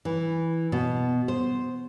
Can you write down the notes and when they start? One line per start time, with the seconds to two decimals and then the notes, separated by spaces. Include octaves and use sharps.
0.05 E3
0.72 B2
1.28 C5